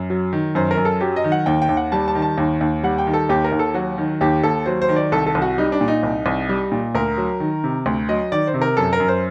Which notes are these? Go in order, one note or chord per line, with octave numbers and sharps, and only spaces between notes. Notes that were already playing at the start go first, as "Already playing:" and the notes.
Already playing: F#2
F#3
D#3
F#2 C5
A#4
F#2
A4
F#3 G4
D#5
D#3
F#5
D#2 G5
G5
D#2
F#5
G3 A5
A5
D#3
A5
D#2
D#2
G3 F#5
G5
D#3
A4
D#2 G4
A#4
D#2
A4
F#3 F#4
D#3
D#2 G4
D#2 A4
F#3 C5
C5
D#3
D5
C2 A4
A4
C2
F#4
G3 D#4
D4
A#2
D#4
C2
C2
G3
A#2
D2 A#4
F#3
D#3
C3
D2
F#3 D#5
D#3 D5
C5
C3
A#4
F#2 A4
A#4
F#2
C5